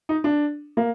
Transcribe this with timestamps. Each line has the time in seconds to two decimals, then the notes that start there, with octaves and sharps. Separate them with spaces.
0.09 D#4
0.24 D4
0.77 A#3